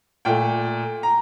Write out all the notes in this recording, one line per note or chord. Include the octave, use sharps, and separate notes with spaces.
A#2 A3 G5
A#5